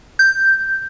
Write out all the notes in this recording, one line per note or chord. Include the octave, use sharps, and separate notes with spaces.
G6